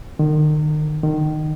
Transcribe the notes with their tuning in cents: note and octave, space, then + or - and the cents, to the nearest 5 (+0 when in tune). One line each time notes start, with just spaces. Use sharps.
D#3 -35
D#3 -20